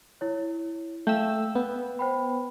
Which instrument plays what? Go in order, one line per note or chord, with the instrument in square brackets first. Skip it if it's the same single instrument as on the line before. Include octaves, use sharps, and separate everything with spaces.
[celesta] E4 C#5
[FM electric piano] A3 E6 [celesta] F5 G5 G6
[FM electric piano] B3
[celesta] C5 G5 B5